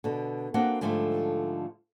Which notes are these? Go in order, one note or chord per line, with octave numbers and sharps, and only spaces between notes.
B2 D3
A#3 C4 D4 F#4 F#5
G#2 D3 F3 G3 A3